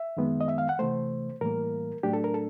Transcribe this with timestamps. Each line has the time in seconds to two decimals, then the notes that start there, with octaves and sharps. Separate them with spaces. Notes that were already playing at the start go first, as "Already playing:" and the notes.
Already playing: E5
0.17 F#2 D#3 G#3 B3
0.41 D#5
0.48 E5
0.58 F5
0.69 F#5
0.79 C3 E3 A3 C5
1.41 A2 E3 G3 A#3 A#4
2.03 A2 F#3 A3 D4 G4
2.13 A4
2.24 A#4
2.34 A4